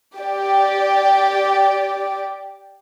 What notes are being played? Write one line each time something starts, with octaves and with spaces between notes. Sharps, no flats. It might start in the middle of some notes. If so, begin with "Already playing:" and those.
G4 D5